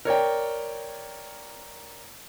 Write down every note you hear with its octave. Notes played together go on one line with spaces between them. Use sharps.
A#4 C#5 D5 G5